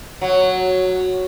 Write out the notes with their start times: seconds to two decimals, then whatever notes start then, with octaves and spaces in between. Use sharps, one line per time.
0.21 F#3